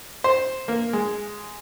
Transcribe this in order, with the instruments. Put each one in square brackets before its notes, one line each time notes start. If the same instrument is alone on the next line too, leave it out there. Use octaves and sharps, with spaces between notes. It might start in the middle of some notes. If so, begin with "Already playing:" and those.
[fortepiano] C5
A#3
G#3